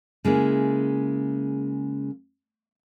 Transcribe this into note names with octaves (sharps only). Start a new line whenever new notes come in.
C#3 G#3 A#3 E4